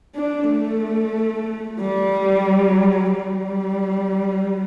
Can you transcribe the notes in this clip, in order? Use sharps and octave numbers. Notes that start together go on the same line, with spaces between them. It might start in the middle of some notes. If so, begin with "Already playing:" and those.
D4
A3
G3
G3